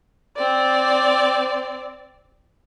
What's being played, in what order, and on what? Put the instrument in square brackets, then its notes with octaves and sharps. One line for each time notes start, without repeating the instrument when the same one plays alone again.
[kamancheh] C4 D5